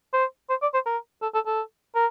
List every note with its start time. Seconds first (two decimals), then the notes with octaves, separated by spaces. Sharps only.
0.13 C5
0.50 C5
0.62 D5
0.74 C5
0.86 A#4
1.22 A4
1.34 A4
1.47 A4
1.95 A#4